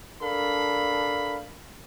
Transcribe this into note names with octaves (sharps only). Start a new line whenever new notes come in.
D4 A4 A#4 F5 B5